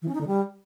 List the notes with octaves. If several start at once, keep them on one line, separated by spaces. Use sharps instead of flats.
E3
C#4
D#4
D3
G3